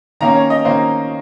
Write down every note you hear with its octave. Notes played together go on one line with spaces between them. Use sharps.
D#3 A#3 C#4 A#5
C#5
D#5
D#3 A#3 C#4 C5